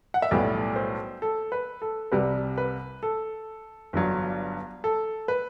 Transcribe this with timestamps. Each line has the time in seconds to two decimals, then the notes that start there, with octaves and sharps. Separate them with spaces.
0.14 F#5
0.22 E5
0.31 B1 A2 G3 B3 D5
0.76 C5
1.22 A4
1.52 B4
1.82 A4
2.12 C2 C3 G3 B4
2.58 B4
3.03 A4
3.93 G1 G2 F#3
4.84 A4
5.28 B4